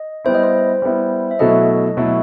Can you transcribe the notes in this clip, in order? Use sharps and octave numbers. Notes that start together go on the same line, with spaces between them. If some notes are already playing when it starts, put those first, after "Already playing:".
Already playing: D#5
G3 B3 E4 C5
D#5
C5
G3 B3 E4
E5
B2 F#3 A3 E4 A4 D#5
B2 F#3 A3 E4 A4